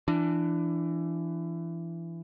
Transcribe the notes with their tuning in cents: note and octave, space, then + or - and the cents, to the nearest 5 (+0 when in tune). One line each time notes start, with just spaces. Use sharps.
E3 +25 D4 +10